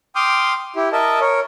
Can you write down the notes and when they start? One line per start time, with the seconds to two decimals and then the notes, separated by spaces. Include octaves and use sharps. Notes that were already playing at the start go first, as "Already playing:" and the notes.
0.16 G5 C6 D6 D#6 F6 G6
0.76 E4 G4
0.92 A#4 D#5 E5 A5
1.21 A#4 C#5